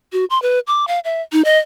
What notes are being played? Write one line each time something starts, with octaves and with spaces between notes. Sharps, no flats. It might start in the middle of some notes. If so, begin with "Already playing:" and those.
F#4
C6
B4
D6
F5
E5
D#4
D#5